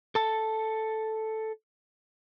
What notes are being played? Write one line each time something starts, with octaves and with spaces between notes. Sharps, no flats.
A4 A5